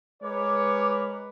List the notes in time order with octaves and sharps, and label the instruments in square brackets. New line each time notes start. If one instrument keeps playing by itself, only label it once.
[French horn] G#3 [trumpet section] A#4 C#5 [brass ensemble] B4 [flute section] D6